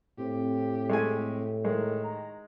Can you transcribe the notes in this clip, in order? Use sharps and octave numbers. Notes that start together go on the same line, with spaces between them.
A2 C4 G4
G#3 A3 G#5
D#3 G#3 A#4
A#5